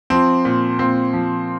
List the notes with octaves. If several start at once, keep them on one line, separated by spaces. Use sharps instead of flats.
F3 C4
A#2
A#2 C4
F3